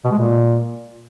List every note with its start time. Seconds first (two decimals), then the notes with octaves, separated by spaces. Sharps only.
0.04 B2
0.11 G#3
0.18 A#2